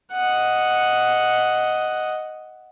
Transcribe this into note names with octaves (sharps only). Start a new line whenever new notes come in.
D#5 F#5